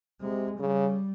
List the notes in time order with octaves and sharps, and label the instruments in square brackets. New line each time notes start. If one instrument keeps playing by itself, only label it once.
[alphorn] C3 [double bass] G#3
[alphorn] C#3 [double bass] G3